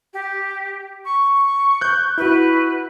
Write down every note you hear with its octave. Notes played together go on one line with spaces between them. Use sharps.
G4
C#6
F#6 G6
E4 F#4 B4